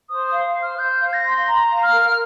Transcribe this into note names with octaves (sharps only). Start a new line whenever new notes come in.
C5 D#6
F5 D#6
C5
F6
C5 G6
F5
A#6
C6
A#5
F5
F6
A#4